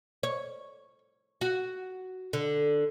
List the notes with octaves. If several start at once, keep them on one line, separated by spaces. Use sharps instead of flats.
C#5
F#4
D3